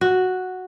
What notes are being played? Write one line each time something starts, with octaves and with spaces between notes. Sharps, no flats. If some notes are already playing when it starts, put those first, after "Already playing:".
F#4